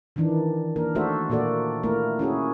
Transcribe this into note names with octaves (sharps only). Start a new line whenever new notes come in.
D#3 E3 D4 D#4
A#3 D4 A#4
A3 D4 F#4 A4 C5 E5
A#2 A#3 F#4 A4 D5
A3 A#3 E4 A#4
C#4 E4 F#4 G#4